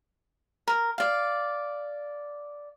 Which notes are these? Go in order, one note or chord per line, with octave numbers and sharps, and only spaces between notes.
A#4
D5 F5